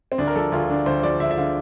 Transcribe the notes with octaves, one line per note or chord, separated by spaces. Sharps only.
C4
D2 D4
A#4
F3 A4
D2 F4
D3 D4
D2 C5
F3 D5
D2 E5
E5
D3 F5